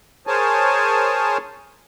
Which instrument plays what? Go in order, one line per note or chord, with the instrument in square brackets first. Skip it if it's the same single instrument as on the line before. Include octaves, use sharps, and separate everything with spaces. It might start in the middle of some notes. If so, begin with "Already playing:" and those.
[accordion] G#4 A#4 C5 C#5 G#5 A5